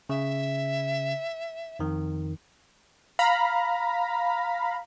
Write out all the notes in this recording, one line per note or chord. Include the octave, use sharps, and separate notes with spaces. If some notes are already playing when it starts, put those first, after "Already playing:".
C#3 E5
F2 D#3
F5 A#5 B5